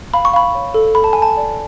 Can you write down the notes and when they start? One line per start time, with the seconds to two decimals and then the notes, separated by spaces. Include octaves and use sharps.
0.14 F5 B5
0.25 C#6
0.34 F5 B5
0.55 C#5
0.74 A4
0.95 A4 B5
1.04 A5
1.13 A4 G#5
1.22 A5
1.37 D5